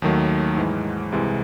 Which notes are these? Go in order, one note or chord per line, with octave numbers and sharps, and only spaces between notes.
D#2 D#3 F#3 A3
G#2 E3 G#3
C2 C3 E3 G#3